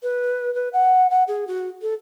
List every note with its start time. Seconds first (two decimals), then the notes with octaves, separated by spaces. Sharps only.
0.03 B4
0.54 B4
0.73 F#5
1.10 F#5
1.28 G#4
1.47 F#4
1.82 A4